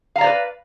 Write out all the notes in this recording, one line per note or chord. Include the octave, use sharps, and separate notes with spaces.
B4 C5 D5 F5 A#5